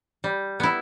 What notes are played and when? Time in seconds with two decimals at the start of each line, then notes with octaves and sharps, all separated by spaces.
0.24 G3
0.60 B3 E4